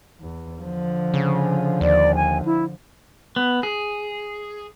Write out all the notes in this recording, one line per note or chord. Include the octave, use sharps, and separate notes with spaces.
E2
D3 F3
C#3
D#2 D5
G#5
E4
B3
G#4